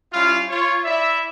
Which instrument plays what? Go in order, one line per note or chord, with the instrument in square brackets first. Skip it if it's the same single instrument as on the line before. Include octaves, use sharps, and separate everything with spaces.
[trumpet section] G3 C#4 E4 F4 F5
F4 C#5
E4 D5 E5